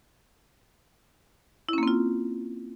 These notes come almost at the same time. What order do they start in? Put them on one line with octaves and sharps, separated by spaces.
E4 C#4 A#3 C4 F4